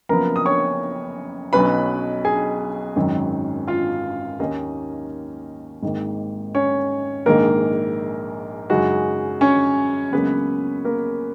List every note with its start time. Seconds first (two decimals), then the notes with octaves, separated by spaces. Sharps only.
0.09 F#1 F#2 F3 B3 A#4 A#5
0.36 D#6
0.46 C#5 C#6
1.53 B1 B2 F#3 C#4 B4 B5
2.25 G#4 G#5
2.96 G#1 F#2 D#3 F#3
3.68 F4 F5
4.39 D#2 D#3 A#3 C#4 D#4 D#5
5.83 G#1 G#2 D#3 A#3
6.54 C#4 C#5
7.26 A#1 G#2 D#3 A#3 A#4
8.70 F#2 C#3 G#3 D#4 F#4
9.41 C#4 C#5
10.12 C#2 C#3 F#3 A#3 B3 C#4 B4
10.85 A#3 A#4